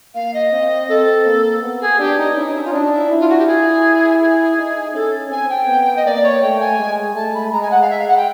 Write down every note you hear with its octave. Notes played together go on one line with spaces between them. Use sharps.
A#3 F5
D#5
C4
C4 A4
A#3
B3
G#4
D4 G4
D#4
C#4 E4
D#4
E4
F4
D4 D#4
D#4
E4
E4
F4
F#4
G4
E4 G#4
G#4
D#4
C#4 A4
C4 G#5
G5
B3
D#5
A#3 D5
C#5
A3 G5
G#5
G#3
A3 A5
B5
G#3 A#5
G#5
F#5
F5
E5
F5
F#5
G5